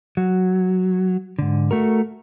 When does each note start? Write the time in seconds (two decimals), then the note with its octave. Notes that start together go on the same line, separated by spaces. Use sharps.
0.17 F#3
1.39 G#2 D3
1.71 A3 F#4 A#4